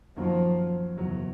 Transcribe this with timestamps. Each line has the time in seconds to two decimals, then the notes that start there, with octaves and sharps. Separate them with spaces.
0.17 F#2 D#3 F3 F#3 A#3
0.97 F#1 E2 B2 F#3